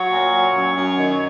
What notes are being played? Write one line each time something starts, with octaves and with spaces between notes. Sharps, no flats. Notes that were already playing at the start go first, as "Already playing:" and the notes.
Already playing: F#3 C#5
A#2
F#3
F#2
F#2
D#3